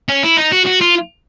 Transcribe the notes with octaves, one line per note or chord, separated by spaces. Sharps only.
C#4
E4
D#4
F#4
F#4
F4